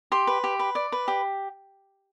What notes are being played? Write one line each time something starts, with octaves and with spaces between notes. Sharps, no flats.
G4 C6
B4
G4
B4
D5
B4
G4